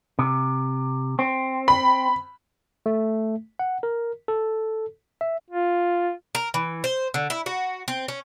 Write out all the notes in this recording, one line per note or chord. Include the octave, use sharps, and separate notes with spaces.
C3
C4
B5
A3
F#5
A#4
A4
E5
F4
A#4
E3
C5
D3
E4
F#4
C4
C#4